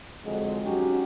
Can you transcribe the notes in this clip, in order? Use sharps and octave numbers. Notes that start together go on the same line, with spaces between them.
F2 D3 F#3 G#3
F#3 C#4 D#4 F#4 G4